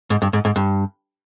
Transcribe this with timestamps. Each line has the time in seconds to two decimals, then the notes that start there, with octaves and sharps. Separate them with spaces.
0.10 G#2
0.22 G2
0.33 G#2
0.45 G#2
0.56 G2